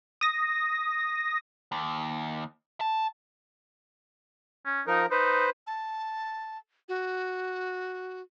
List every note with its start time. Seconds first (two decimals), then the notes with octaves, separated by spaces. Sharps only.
0.21 D#6 A#6
1.72 D#2
2.81 A5
4.66 C#4
4.87 F3 D#4 A#4
5.11 D#4 B4 C5
5.67 A5
6.89 F#4